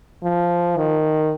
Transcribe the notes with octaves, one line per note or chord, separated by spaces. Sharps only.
F3
D#3